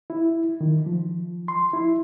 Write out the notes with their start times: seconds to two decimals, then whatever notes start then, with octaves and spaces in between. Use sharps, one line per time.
0.10 E4
0.61 D#3
0.86 F3
1.48 C6
1.74 E4